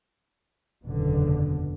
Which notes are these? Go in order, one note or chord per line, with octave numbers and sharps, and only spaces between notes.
F#1 E2 B2 D3